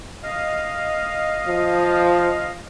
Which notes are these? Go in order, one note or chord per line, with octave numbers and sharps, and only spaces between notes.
D#5 F5
F3